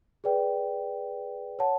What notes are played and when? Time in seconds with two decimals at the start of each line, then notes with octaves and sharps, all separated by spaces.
0.24 G#4 B4 D5 G5
1.59 C#5 F#5 A5